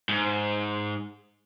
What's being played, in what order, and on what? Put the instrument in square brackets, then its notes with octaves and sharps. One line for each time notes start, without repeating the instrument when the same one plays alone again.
[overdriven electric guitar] G#2